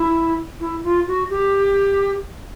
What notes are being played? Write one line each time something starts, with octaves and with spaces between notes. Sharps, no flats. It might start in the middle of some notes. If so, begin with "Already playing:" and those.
Already playing: E4
E4
F4
F#4
G4